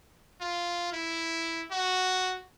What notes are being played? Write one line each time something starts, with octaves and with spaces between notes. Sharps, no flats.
F4
E4
F#4